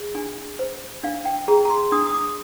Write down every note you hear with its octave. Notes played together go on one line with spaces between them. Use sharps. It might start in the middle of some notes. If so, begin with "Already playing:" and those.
Already playing: G#4
D4 G#5
C5
D4 F5
G5
G#4 A#5
A#5
C6
D4 D#6
D#6
D6